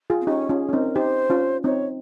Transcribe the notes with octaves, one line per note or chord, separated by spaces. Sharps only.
F4 G#4
C4
C#4 D#4 G4
C#4 F4 G#4
C#4
C4 D#4 A#4
D#4 G4 C5
C#4 F4
C4 D#4 C#5